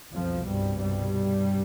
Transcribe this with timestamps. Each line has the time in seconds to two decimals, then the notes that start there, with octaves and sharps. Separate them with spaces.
0.12 C2 F2 B2 F3
0.46 G2 G3
0.80 G2 G3